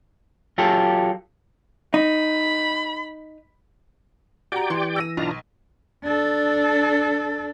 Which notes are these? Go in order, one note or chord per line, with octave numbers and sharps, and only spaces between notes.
F#3 F4 G4 A4
D#4 B5
F#4 G4 D5 G5 A#5
E3 C6
E6 A#6 D#7
B1 D4 F4 A#5
D4 A4